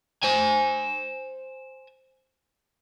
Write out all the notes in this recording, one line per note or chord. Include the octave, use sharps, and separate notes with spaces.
C5 G#5